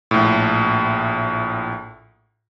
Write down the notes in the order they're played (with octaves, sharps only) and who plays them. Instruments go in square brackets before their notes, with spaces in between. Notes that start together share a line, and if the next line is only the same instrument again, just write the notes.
[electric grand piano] A#1 A2